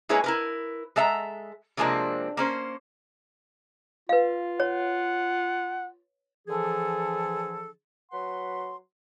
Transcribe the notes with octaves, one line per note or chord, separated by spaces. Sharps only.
G#3 A#3 E4 G#4 B4 C#5
E4 A#4 B4
G#3 A4 E5 F#5 A#5
C3 F3 G#3 A#3 C4 D4
A#3 C#4 C5
F4 B4 F5
C#5 F#5
D3 E3 F3 G#4 A4
F#3 B4 F#5 C6